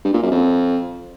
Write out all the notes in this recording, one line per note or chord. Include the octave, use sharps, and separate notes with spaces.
G2
A#2
F#2
F2